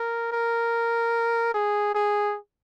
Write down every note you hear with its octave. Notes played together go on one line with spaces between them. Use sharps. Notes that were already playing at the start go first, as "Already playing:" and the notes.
Already playing: A#4
A#4
G#4
G#4